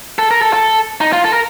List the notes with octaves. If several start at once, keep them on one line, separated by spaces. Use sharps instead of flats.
A4
A#4
A4
A4
D#4
F4
A4
A#4